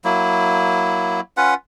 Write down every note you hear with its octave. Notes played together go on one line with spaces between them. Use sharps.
F#3 A#3 E4
C#4 F4 B4 F#5